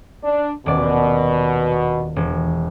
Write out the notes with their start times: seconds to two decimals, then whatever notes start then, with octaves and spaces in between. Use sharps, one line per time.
0.23 D4
0.66 D#1 B2 D5
2.16 E1